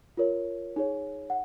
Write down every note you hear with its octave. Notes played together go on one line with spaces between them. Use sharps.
F4 A#4 C#5
D#4 G#4 C#5
F#5